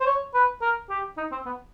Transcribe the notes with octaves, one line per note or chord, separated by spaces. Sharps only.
C5
C#5
B4
A#4
G4
D#4
C4
B3